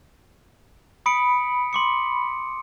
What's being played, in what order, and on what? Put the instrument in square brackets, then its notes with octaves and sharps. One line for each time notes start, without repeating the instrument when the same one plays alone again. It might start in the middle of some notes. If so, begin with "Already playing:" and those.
[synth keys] B5 [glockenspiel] D#6 C#7 D7
[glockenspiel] C6 D6 C#7